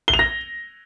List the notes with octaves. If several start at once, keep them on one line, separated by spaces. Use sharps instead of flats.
G7
F7
A#6